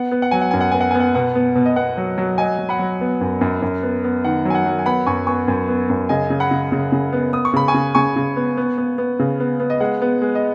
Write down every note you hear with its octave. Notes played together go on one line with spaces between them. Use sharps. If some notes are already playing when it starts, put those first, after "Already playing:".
Already playing: B3 F#5
B3
F#5
F#3 G#5
F#5
F#2 G#5
F#5
B3 G#5
F#5
B3 G#5
F#5
B2 F#5
B3
B2
D#5
B3 F#5
F#3
F#3
F#3 D#5 G#5
F#3
F#5 B5
F#3
B3
F#2
F#2
F#2
B3
B3
D#3 F#5
F#3
G#5
F#5
F#3
G#5
B3 F#5 B5
F#2 G#5 C#6
B3 G#5 C#6
F#2
B3
F#2
C#3 D#5 G#5
C#3
F#5 B5
C#3
C#3
C#3
B3
B3 D#6
C#6
C#3 B5
G#5 C#6
C#3
C#3 G#5 C#6
C#3
B3
B3
B3
B3
C#3
B3
B3
D#5
G#3 F#5
B3
G#3
D#5